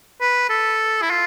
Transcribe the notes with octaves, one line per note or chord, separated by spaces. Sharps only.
B4
A4
E4
F4